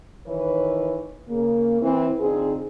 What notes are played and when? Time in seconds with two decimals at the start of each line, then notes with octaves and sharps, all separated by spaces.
0.27 D#3 E3 B4 C#5
1.29 C#3 A#3
1.82 E3 C4
2.20 D3 C4 D#4 F4 G#4